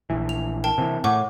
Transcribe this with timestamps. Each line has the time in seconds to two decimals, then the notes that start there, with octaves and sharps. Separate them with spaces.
0.10 A#1 E3
0.29 F7
0.64 A#4 G5 A5
0.78 C3 E3
1.04 A2 F#5 C#6 D6